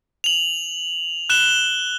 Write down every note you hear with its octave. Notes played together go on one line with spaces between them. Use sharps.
F7 F#7
F#6 E7 G7